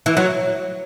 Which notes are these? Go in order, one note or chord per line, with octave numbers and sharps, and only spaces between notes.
E3
F#3